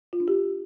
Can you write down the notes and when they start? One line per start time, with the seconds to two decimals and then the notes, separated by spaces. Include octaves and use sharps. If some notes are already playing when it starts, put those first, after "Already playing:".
0.13 F4
0.20 D4
0.28 G4